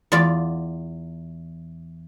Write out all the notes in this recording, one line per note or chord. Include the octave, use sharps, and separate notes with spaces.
E2 F4 D5 B5